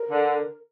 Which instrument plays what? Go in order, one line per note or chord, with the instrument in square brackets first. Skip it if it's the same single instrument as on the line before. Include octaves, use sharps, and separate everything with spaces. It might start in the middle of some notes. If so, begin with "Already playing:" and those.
Already playing: [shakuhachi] A#4
[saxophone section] D3